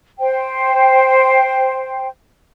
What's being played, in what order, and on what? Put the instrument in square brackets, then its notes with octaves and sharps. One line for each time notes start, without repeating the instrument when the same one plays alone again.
[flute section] C5 G5